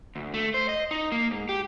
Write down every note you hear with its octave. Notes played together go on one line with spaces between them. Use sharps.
D2
A3
C5
D#5
D#4
A#3
G#2
G4